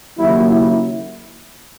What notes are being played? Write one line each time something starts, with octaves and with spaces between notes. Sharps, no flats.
D#2 C#3 F#3 A#3 E4
E4